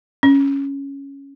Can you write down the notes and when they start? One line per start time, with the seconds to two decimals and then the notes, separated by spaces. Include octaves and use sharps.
0.23 C#4